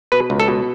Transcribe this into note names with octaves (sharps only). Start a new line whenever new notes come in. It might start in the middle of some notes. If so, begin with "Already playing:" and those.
B2 B4
C#2
A4
B2